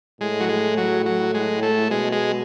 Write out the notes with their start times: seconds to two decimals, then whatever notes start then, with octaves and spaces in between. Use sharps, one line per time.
0.21 A2 G#3
0.40 F#3
0.49 G#3
0.78 F#3
1.06 F#3
1.34 G#3
1.63 A3
1.91 B2 G#3
2.13 G#3